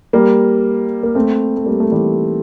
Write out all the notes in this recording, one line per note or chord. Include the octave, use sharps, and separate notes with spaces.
G3 A#3
A#3
A3 C4
A3
G3 A#3
A3
E3 G3